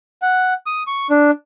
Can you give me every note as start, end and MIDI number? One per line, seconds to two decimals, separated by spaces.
0.22 0.54 78
0.66 0.83 87
0.87 1.07 85
1.10 1.31 62